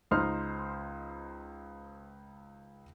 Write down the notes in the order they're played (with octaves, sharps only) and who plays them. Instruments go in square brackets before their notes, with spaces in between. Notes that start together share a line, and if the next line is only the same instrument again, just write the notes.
[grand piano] C#2 D#4 C5 F6